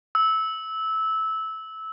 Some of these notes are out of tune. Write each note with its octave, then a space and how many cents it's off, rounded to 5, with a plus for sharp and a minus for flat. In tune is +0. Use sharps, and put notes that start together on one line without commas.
E6 -15